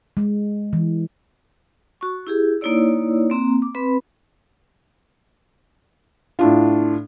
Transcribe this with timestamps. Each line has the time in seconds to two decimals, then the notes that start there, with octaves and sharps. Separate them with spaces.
0.17 G#3
0.73 E3
2.01 F#4 C#6
2.27 E4 G4 G#4
2.61 A#3 D#4 E4 C#5 D5 E6
3.30 A#3 C4 A#5
3.62 D6
3.74 C4 B4 B5
6.39 A2 D4 F4